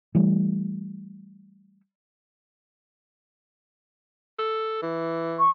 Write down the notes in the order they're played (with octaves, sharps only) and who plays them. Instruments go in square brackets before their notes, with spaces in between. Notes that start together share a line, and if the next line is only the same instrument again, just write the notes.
[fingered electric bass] E3 G3 A3
[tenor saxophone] A4
E3
[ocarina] C#6